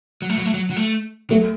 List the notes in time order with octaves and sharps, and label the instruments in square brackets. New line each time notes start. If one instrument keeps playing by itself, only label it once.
[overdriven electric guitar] F#3
A3
F#3
A3
F#3
F#3
A3
[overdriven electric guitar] F#3 [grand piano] A3